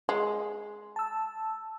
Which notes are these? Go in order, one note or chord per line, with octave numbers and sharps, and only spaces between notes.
G#3
A5 E6